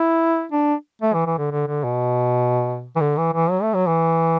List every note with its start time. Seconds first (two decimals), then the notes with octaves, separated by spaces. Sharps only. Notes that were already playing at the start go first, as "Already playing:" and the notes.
Already playing: E4
0.52 D4
1.02 A3
1.13 E3
1.26 E3
1.38 D3
1.52 D3
1.67 D3
1.84 B2
2.95 E3
3.00 D3
3.17 E3
3.34 E3
3.50 F#3
3.62 A3
3.74 F#3
3.87 E3